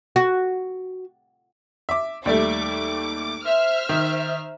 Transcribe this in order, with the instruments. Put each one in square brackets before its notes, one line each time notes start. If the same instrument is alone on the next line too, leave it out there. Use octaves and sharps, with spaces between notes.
[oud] F#4
[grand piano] E5 D6
[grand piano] D#2 G3 A3 [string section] D6
[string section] C5 E5 F6
[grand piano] D#3